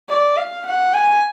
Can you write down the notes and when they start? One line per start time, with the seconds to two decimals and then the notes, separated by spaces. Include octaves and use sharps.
0.09 D5
0.37 F5
0.66 F#5
0.93 G#5